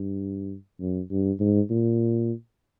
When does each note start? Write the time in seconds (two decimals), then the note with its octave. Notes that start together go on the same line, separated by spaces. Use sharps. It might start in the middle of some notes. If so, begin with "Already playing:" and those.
Already playing: G2
0.80 F#2
1.11 G2
1.40 G#2
1.70 A#2